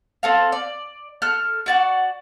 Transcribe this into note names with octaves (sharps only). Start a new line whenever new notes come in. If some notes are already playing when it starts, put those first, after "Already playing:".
C4 A4 F5
D5
A4 F6 F#6
F#4 D5 F#5